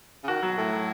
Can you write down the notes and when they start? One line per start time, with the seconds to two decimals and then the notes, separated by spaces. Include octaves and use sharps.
0.24 C#3
0.28 D#3 F#4
0.43 B2 F#3
0.58 A2 A4
0.72 F#3